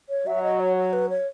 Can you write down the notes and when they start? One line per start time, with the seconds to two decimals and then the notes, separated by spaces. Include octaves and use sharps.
0.09 C#5
0.27 F#3 E5
0.43 D#5
0.60 C#5
0.77 C#5
0.93 B4
1.10 C#5